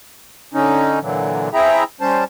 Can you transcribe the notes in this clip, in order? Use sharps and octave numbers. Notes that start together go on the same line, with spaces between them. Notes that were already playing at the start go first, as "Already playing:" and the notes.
D3 C#4 D#4
A#2 D3 E3 F#3
C4 E4 G#4 E5 G5 A#5
G3 C#4 C5 A5